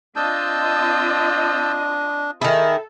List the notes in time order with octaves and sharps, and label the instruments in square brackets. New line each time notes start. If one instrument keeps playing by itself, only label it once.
[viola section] C4 F4 D#5 [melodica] D4 [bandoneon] A5 E6 G6
[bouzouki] D#3 E4 [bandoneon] G#4 A5 [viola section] A4